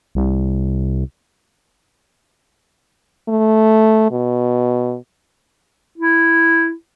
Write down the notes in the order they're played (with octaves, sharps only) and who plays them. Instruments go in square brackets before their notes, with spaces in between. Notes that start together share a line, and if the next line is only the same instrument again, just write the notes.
[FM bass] C2
[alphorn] A3
B2
[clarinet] E4